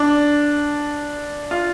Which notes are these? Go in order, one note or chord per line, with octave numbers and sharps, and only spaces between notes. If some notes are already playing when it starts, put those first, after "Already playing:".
Already playing: D4
F4